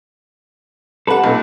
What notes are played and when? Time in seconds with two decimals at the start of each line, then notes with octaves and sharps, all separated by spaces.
1.07 G3 A4 B4 F#5
1.24 B1 A#2